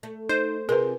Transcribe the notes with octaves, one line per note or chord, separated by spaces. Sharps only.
A3
D#4 C5
C3 D#4 F4 G#4 A#4 B4